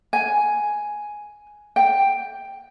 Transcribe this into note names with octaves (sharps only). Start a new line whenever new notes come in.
G#5
G5